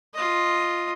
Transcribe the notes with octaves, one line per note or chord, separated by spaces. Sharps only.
F4 D#5